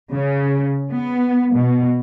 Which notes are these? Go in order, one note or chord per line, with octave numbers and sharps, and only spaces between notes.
C#3
B3
B2